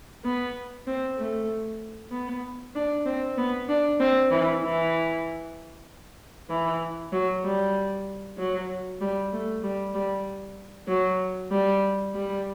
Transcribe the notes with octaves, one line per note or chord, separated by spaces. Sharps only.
B3
C4
A3
B3
D4
C4
B3
D4
C4
E3
E3
E3
F#3
G3
F#3
G3
A3
G3
G3
F#3
G3
G3